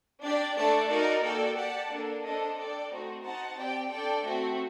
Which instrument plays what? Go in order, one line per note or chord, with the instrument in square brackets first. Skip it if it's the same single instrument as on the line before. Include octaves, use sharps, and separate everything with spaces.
[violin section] D4 G4 D5
A3 D4 A4 D5 A5
D#4 F#4 A#4 D5
A#3 F#4 A4 D5 G5
G4 D5 F#5 A5
A#3 D4 A4
D4 A4 C5 D#5
D4 A4 D5 G5
A3 C4 D#4 F#4 C5
D#4 F#4 C5 F#5 A5
C4 G4 D5 G5
D4 A4 D5 G5
A3 C4 F#4